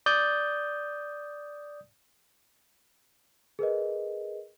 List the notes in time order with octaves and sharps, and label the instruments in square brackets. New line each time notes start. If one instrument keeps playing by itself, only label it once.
[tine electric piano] D5 D#6 G6
[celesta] G#4 A#4 B4 D#5